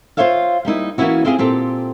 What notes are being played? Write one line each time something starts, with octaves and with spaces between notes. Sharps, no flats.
F4 G4 C5 C#5 E5 F5
G3 A#3 D#4 E4
E3 A#3 B3 C#4 E4 F#4
C4 E4 F4 G4 G#4
A#2 C4 G4 A4